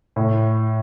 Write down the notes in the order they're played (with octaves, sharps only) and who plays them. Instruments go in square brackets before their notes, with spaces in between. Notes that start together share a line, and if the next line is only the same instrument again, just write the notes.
[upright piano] A2